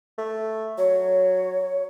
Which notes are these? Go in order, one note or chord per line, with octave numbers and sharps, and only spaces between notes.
A3
F#3 C#5